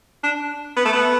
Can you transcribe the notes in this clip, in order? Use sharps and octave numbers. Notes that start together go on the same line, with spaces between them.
D4
B3
A3
B3